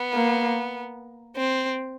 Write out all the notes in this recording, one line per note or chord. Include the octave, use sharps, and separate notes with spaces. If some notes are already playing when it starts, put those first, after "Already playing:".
Already playing: B3
A#3
C4